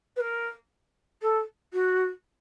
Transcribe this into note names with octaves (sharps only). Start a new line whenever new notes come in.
B4
A#4
A4
F#4